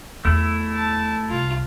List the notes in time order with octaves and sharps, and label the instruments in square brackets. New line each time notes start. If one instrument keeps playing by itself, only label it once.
[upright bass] E2 [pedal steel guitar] A3 E4
[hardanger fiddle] A5
[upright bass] C2 [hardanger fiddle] F4